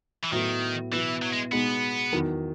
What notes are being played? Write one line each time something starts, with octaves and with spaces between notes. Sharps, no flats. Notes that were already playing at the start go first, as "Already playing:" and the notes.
E3
A2 D#3 F#3 B3
B2 E3 F#3 B3 E4
F#3
G#3
B2 G#3 B3 D#4
E2 D#3 F#3